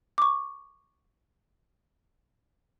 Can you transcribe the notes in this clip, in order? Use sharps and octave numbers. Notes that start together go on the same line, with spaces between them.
C#6 D6